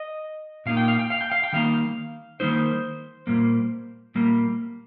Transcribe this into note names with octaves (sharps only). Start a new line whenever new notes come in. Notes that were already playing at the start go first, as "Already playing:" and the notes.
Already playing: D#5
A#2 A#3 D#4 F5
G5
F5
G5
F5
G5
F5
G5
D#3 G3 A#3 D#4 F5
D#3 G3 A#3 D#4 C5
A#2 G3 A#3
A#2 G3 A#3